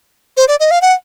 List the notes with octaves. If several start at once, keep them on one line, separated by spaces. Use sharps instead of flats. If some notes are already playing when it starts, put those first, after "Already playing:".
C5
D5
D#5
F5
F#5